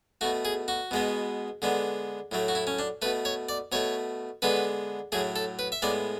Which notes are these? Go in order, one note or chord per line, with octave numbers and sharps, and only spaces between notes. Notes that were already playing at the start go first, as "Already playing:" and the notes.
B2 A3 F#4
G#4
F#4
B2 G#3 B3
D3 G#3 B3
A2 F#3 A3
F#4
E4
C#4
D4
B2 A3 B4
C#5
D5
B2 A3 C#5
D3 G#3 B3 B4
A2 F#3 A3 G#4
A4
B4
E5
A2 G#3 B3 D5